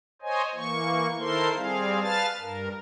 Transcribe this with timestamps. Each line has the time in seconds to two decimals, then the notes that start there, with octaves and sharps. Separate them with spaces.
0.22 C5 C#5 D#5 G#5
0.55 E3 A#3 C#6
1.19 D#3 E4 A4 A#4 C5 C6
1.55 G3 C4 G#4 F5
2.01 B4 F5 A5 F6 A6
2.41 G2 A#4